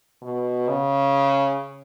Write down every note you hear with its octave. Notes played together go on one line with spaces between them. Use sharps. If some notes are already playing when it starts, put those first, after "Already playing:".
B2
C#3